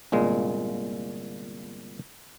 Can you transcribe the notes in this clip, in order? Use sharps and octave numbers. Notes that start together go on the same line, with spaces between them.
G1 C2 A#2 G#3